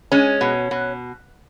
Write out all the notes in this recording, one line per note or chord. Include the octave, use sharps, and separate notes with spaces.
G#3 C#4
B2
B2